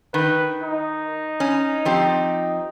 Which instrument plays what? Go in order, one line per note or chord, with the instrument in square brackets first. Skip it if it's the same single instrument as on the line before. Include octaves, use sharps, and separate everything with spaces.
[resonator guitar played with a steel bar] D#3 [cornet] B4
[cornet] D#4
[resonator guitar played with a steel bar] C#4
F3 C4 G4